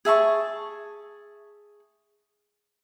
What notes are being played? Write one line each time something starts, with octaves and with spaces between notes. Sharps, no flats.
G#4 E5 A5 C#6